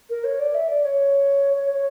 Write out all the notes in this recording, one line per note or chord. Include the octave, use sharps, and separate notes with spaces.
A#4
C#5
D5
E5
D5
C#5
C#5
C#5